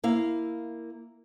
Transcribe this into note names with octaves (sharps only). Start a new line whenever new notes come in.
A#3 E4 F5